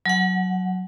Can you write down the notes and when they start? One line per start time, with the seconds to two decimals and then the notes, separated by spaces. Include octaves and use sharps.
0.06 F#3 F#5